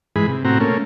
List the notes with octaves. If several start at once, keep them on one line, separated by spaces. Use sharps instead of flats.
G#2 E3 G#4 B5
C3
A2 C3 C4 F#4 A#5
A3 A#3 C#4